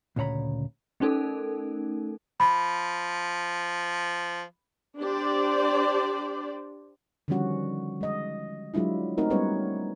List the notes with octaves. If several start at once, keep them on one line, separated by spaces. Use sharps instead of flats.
D2 A#2 C#3 C#5 A#5 B5
A3 C#4 D#4 A4 A#4
F3 B5
D4 G4 C5 D5
D3 D#3 F3 G3 C#4 F#4
G#3 D#5
F#3 G#3 D4 E4 F4
A3 C4 D#4 F#4 A#4
G3 G#3 B3 C#4 B4 C#5